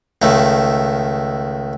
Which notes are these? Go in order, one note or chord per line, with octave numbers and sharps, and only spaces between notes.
C#2 D#3 A3